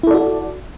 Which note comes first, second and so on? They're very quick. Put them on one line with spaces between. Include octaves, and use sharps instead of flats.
E4 A4 D5 F#4